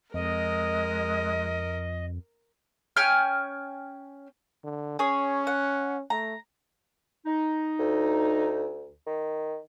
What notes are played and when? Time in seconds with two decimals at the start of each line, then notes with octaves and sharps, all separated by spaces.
0.14 F2 G#3 A#4 D#5
2.97 C#4 G5 G#5 F6
4.64 D3
4.99 C#4 G#4 C#5
5.47 F#5
6.10 A3 A#5
7.26 D#4
7.79 D2
9.07 D#3